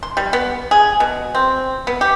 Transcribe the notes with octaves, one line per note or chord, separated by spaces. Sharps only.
C6
G3
B3
G#4
B2
C4
B3
G4